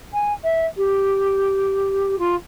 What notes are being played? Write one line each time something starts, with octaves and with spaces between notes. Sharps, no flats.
G#5
E5
G4
F4